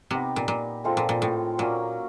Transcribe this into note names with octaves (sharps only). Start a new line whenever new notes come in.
C3 B3 D#4 G4 B4
A#2
A#2
G#3 C4 F4 A4
A#2
A#2
A2
A#2 F#3 A#3 C#4